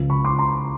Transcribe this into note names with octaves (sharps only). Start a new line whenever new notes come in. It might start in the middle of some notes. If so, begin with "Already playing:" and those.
Already playing: C#2 C#3 F3
B5 C#6
C6 D6
A#5 C6